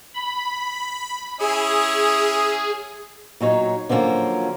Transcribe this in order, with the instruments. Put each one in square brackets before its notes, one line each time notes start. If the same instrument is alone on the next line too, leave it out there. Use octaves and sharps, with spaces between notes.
[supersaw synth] B5
[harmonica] C#4 E4 D#6 [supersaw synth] G#4
[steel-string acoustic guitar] A#2 F#3 D#4 C#5
D3 F3 F#3 A#3 C#4